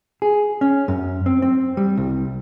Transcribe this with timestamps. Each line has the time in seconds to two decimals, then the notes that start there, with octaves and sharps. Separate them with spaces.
0.22 G#4
0.61 C#4
0.88 F#2
1.26 C4
1.42 C4
1.77 G3
1.97 C2